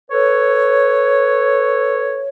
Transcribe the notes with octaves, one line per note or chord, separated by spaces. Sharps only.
A4 B4 C#5